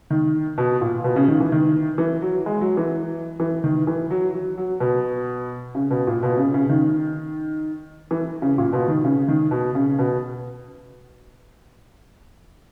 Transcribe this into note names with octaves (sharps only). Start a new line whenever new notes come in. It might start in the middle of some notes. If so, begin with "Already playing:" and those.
D#3
B2
A#2
B2
C#3
D#3
E3
D#3
E3
F#3
G#3
F#3
E3
E3
D#3
E3
F#3
F#3
F#3
B2
C#3
B2
A#2
B2
C#3
C#3
D#3
E3
C#3
A#2
B2
D#3
C#3
D#3
B2
C#3
B2